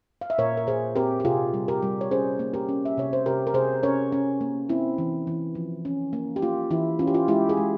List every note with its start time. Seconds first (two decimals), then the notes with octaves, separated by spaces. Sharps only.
0.21 F5
0.30 E5
0.38 A#2 A#4 C#5
0.57 A#4
0.67 A#2 G#4 C5
0.96 C4 G4 A#4
1.20 G4
1.25 C3 F4 G#4
1.54 G3
1.68 G4 A#4
1.83 G3
2.01 C#5
2.11 C#4 G#4 C5
2.39 A#3
2.54 G4 A#4
2.69 C#4
2.85 E5
2.97 C3 C#5
3.13 C5
3.26 C3 G4 A#4
3.47 A#4
3.54 C3 G#4 C5
3.83 C#4 A#4 C#5
4.12 C#4
4.41 A#3
4.69 C4 E4
4.98 E3
5.27 E3
5.55 F3
5.85 C#4
6.13 A#3
6.36 G4
6.42 A#3 F4
6.71 E3 E4
6.99 C#4 F4
7.07 G4
7.14 F4
7.28 G#3 E4 G4
7.49 F4 G#4
7.57 G#3